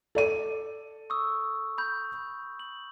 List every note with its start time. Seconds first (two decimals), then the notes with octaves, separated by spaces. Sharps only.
0.15 A4 D5 D#7
1.10 C#6 D#6 E6
1.78 B5 G6
2.59 F#7